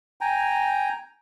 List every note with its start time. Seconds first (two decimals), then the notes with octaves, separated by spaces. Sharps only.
0.21 G5 G#5 A#5